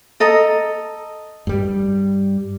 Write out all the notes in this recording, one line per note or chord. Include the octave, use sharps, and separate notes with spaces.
A4 D#5 A#5
G2 G3